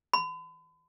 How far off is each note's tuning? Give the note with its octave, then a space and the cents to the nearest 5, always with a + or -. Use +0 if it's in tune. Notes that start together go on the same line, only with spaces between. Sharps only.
B5 +40